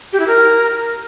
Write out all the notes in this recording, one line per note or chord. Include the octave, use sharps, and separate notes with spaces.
G4
E4
A#4